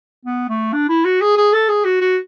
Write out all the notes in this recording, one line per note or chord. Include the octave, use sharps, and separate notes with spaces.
B3
A3
D4
E4
F#4
G#4
G#4
A4
G#4
F#4
F#4